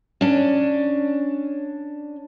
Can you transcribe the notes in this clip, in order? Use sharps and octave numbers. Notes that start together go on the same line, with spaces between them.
C#4 D4